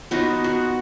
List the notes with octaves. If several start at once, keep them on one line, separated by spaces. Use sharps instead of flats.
B3 D#4 F4 F#4
F#4